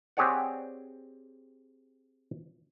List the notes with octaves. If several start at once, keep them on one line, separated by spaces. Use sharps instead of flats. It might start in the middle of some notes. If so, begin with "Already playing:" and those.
C4 G4 G#4 C#5 D5 F#5